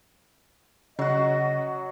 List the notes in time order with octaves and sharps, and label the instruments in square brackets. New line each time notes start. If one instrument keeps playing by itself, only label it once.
[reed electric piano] C#3 [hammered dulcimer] F#3 F#4 [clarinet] D#5